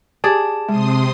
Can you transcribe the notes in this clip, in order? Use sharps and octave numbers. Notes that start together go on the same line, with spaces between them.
G4 G#4 D5 A5
C3 G#3 C6 D#6